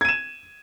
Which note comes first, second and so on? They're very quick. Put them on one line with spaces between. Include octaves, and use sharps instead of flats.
G#6 D#7 E7